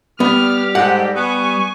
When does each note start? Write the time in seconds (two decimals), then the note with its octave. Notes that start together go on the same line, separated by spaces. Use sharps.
0.20 G3 B3 G4 F6
0.75 G#2 G4 A4 F#5
1.16 B3 G#5 C#6